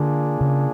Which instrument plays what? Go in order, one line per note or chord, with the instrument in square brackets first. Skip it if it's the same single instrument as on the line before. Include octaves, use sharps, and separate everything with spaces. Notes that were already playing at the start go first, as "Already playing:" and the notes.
Already playing: [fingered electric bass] D3 [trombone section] A#3 D4 F4 G#4
[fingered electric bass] C#3